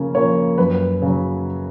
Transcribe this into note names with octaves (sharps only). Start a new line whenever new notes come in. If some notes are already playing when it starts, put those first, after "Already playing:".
Already playing: C#3 F3 A#3 C#4
F3 A#3 C#4 C#5
F#2 B4
C#3 F#3